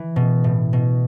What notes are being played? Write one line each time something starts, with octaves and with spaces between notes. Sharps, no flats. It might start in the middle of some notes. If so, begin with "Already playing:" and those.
Already playing: E3
B2
A2
B2